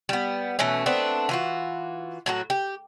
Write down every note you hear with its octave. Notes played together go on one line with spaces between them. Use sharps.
G3 B3
B2 E3 A3 C#4
A3 B3 C4 D4
E3 F4 F#4
A2 F#3 F#4
G4